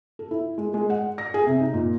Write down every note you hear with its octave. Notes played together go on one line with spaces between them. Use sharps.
A4
E4
G#3
G#3
F#5
A#6
G#4
C3
D#4
A#2